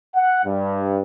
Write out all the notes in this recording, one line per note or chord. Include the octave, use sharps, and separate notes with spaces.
F#5
G2